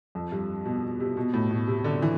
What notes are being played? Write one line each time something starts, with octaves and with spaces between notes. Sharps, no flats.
F2
G2
B2
C3
B2
A2
B2
C3
D3
E3